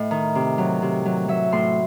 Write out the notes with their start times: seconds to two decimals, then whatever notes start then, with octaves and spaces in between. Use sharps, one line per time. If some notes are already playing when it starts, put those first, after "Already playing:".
Already playing: A2 D#5
0.11 D#3
0.35 C3
0.58 F#3
0.82 C3
1.05 F#3
1.28 F#3 E5
1.52 A2 C6